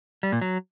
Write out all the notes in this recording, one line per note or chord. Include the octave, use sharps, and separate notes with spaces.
G3
A#2
F#3